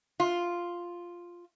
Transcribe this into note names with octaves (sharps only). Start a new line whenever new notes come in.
F4